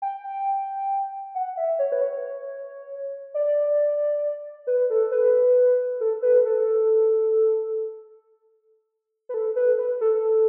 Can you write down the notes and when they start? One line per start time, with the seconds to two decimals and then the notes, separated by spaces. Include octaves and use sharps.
0.02 G5
1.35 F#5
1.57 E5
1.79 C#5
1.92 B4
2.02 C#5
3.34 D5
4.67 B4
4.90 A4
5.12 B4
6.01 A4
6.22 B4
6.45 A4
9.29 B4
9.34 A4
9.56 B4
9.78 B4
10.01 A4